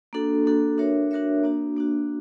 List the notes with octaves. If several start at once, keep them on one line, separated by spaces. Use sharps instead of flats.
A#3 D4 F#4 A4
A#3 D4 F#4 A4
D4 F#4 A#4 C#5 E5
D4 F#4 A#4 C#5 E5
A#3 D4 F#4
A#3 D4 F#4